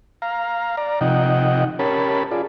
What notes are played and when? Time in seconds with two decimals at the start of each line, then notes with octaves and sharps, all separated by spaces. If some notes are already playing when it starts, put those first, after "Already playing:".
0.22 F5 A#5
0.77 D5 A#5
1.01 C3 F3 D#4 D#5 F#5 G5
1.79 C#4 G4 A#4 C#5 A5 B5
2.31 F4 G#4 D5